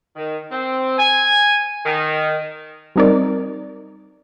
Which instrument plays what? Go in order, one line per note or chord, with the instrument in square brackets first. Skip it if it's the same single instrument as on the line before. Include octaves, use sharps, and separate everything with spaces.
[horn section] D#3
C4
G#5
D#3
[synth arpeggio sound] G3 C4 D#4 A#4 D5